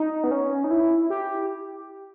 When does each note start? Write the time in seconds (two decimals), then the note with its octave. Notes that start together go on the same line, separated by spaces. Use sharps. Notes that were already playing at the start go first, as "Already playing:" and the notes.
Already playing: D#4
0.24 B3
0.31 C#4
0.64 D#4
0.71 E4
1.10 G4